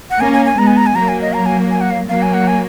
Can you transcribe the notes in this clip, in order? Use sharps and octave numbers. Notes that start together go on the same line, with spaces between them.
F#5
A#3 C#4 G#5
G#5
G#5
G#3 B3 A#5
G#5
A#5
G#5
F#3 A#3 A#5
G#5
D#5
A#5
G#5
G#5
F#5
F5
F#3 A#3 F5
G#5
F#5
G#5